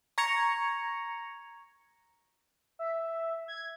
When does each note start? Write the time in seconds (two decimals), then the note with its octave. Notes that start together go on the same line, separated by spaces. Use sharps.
0.18 A#5 C#6 G#6 A#6 C#7 F7
2.79 E5
3.48 G#6